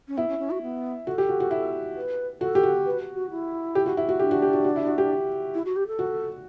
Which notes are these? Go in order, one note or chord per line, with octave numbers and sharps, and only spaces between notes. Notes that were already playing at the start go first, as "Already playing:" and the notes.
C#4
B3 E4
C#4
C#4
F#4
B3
F#4 A4
G4
F#4
F#4
E4
B4
F#4 A4
G4
F#4
B4
F#4
E4
G4
F#4
E4
F#4
D4 G4
F#4
G4
F#4
F#4
E4
F#4
G4
E4
F#4
G4
A4
F#4